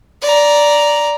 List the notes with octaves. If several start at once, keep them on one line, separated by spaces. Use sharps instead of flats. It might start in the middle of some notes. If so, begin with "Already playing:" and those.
D5 A#5